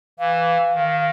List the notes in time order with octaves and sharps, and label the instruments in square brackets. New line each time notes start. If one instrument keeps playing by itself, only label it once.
[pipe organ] E3 [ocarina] F5
[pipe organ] D#3